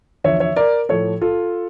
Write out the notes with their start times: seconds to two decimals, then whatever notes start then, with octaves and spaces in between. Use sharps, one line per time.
0.24 E2 D3 F3 C#5 E5
0.40 C#5 E5
0.56 A#4 D5
0.89 A2 F3 A4 C#5
1.21 F4 A4